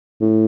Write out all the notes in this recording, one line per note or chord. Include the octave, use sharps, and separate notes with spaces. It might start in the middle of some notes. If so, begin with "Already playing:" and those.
A2